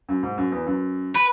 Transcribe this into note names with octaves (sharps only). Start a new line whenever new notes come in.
F#2
G#2
F#2
E2
F#2
B4